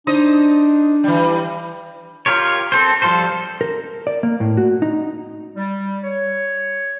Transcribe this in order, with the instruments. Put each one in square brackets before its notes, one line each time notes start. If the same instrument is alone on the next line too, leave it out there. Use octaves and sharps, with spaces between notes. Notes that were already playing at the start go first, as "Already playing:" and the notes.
[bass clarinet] D4 [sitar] D#4 C5 D#5
[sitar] E3 G3
[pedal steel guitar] F4 G4 A#4 C#5
C4 A4 C5
F3 G3 F4 A4 C5
[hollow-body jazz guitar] A#4
D5
A#3
A2
F#4
D#4
[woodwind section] G3
C#5